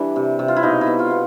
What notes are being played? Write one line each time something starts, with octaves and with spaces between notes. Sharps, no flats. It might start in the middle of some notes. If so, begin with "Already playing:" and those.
Already playing: E3 G3 D4
C3
C3
F4
E4
B2 D#4
E4
B2
F4
B3